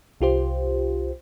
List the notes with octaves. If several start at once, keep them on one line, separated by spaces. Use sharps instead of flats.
C2 F4 G4 C5